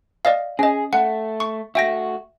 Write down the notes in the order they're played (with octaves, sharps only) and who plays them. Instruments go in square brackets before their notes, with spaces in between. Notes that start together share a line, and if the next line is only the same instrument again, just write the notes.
[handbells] D5 D#5 F5
[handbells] C#4 D#5 [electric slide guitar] G#4
[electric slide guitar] A3 [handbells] F#5
[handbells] C#6
[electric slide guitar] A3 F#4 [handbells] E5 G5 A#6